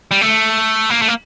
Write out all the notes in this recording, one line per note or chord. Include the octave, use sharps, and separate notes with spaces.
G3
A3
A#3
A3
A#3